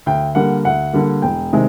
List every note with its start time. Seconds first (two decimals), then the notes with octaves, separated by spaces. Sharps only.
0.06 D2 G5
0.35 D3 G3 A#3 F#5
0.65 D2 F#5
0.93 D3 G3 A#3
1.22 E1 G5
1.53 C3 D#3 G#3